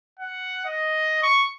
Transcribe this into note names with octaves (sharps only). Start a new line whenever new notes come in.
F#5
D#5
C#6